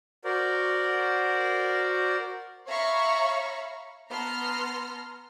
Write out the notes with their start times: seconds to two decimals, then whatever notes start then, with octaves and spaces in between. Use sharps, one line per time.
0.25 F#4 A#4 C5 D5
2.67 C#5 E5 F5 A#5 B5 C#6
4.09 B3 A5 A#5 C6 F6